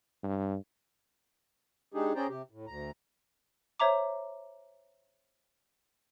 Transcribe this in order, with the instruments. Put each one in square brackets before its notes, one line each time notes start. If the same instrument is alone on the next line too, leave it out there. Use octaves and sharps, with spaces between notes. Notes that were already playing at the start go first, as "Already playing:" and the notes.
[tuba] G2
[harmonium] G#3 D4 D#4 G4 G#4
C#4 G#4 C5 D5 G5 A#5
C3 G4
A2
D2 A#5
[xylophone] C5 C#5 E5 A#5 D6